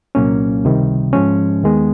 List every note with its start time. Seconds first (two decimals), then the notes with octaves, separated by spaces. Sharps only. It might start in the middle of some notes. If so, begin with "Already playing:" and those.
0.15 C2 A#2 F#3 A#3 C#4
0.64 C#2 C3 D#3 G3
1.13 G#2 F3 G#3 C#4
1.63 D#2 D#3 G#3 B3